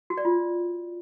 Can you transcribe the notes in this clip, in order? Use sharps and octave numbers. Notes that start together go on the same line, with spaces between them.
F#4
D5
F4